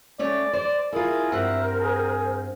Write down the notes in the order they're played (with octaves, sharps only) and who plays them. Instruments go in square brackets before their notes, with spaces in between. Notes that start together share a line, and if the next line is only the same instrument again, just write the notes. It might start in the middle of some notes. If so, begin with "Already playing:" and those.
[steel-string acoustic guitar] A3 C#4 C#5 [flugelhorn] D5
[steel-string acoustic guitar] C5 [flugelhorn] D5
[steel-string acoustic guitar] E4 F4 [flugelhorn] G#4 [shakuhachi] A#4
[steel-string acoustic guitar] G2 C4 F#5 [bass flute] C5 [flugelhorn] E5
[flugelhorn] G#4